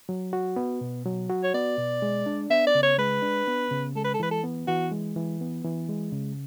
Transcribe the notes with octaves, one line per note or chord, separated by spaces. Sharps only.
F#3
F#4
B3
B2
F#3
F#4
C#5
B3 D5
B2
G#3
D4
B3 E5
D5
C#3
C#5
G#3 B4
D4
B3
C#3
G#3 A4
B4
A4
E3 B4
A4
B3
E3 F#4
G#3
E3
B3
E3
G#3
C#3